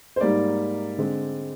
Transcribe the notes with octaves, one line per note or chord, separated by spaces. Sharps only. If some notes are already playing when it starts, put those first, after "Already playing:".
C5
G#2 G3 A#3 D5
D3 G#3 C4